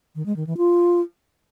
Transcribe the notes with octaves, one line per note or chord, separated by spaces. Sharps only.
D#3
G#3
D#3
E3
F4